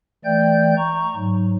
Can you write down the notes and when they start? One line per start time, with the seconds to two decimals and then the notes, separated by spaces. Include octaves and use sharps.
0.25 E3 A3 D5 G5 G6
0.77 A#5 C#6
1.15 G#2 F#3